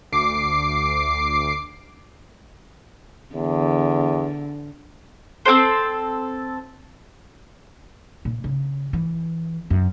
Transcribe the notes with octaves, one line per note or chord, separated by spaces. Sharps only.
D2 D6 C7
E2 D3
C4 G4 A4 C5
A#2
C#3
E3
F#2